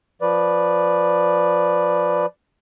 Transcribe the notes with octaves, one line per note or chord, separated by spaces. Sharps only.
F3 B4 D5